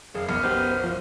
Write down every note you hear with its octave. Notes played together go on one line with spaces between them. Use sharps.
F#1 G#4 F5
F#1 B1 B3 F6 C#7
B3 G4 C5
F3